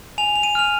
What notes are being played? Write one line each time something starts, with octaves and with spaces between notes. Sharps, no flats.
G#5 F7
F7
D#7
F6 F7